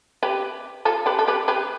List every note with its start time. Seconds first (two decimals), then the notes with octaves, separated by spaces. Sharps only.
0.23 G4 B4
0.85 F4 A4
1.06 G4 B4
1.19 A4
1.27 G4 B4
1.48 G4 B4